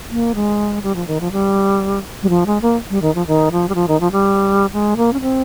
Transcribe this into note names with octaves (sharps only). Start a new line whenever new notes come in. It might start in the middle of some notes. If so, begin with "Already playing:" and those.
A#3
G#3
G3
F3
D#3
F3
G3
G3
F3
G#3
A#3
G3
D#3
F3
D#3
F3
G3
F3
D#3
F3
G3
G#3
A#3
C#4
C4